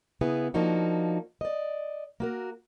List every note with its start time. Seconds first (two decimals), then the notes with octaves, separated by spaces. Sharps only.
0.21 C#3 B3 E4 G#4
0.54 F3 A#3 D4 D#4 F#4
1.41 D5 D#5
2.20 A#3 F#4 A#4